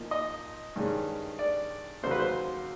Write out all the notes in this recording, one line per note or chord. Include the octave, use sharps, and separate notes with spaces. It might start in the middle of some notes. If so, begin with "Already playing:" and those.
Already playing: A#2 F3 A#3 D#4
D#5
G2 D#3 G#3 C#4
D5
D#2 C#3 F#3 C5
B4
C5